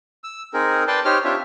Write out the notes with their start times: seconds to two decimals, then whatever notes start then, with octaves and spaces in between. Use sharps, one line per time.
0.24 E6
0.54 C4 D#4 G#4 A#4
0.87 B4 D5 G5 A5 C6
1.05 D#4 G4 C5 C#5 F6
1.24 C4 D4 F4 G4 C#5 E5